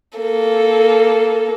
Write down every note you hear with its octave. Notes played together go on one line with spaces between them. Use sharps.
A#3 A4